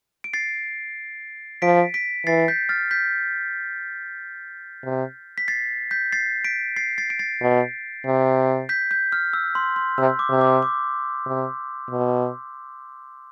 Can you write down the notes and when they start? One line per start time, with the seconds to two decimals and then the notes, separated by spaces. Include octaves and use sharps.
0.24 D7
0.33 A6 C7
1.62 F3 B6 D7
1.94 B6 D7
2.27 E3 A6 C7
2.48 G6 B6
2.69 F6 A6
2.91 G6 B6
4.84 C3
5.38 B6
5.48 A6 C7
5.91 G6 B6
6.12 A6 C7
6.44 B6 D7
6.76 A6 C7
6.98 A6 C7
7.10 D7
7.19 A6 C7
7.41 B2
8.06 C3
8.69 G6 B6
8.91 G6
9.12 F6
9.33 E6
9.55 C6
9.76 C6
9.98 C3 E6
10.19 D6
10.30 C3
10.41 D6
10.63 D6
11.26 C3
11.90 B2